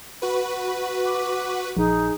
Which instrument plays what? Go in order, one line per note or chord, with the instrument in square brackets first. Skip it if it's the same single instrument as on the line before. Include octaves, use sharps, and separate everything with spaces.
[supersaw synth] F#4 B4
[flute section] D6
[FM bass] A#1 [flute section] D#4 G#4